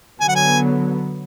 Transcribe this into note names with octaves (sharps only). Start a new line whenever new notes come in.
D3 F#3 B3 G#5
F#5
G#5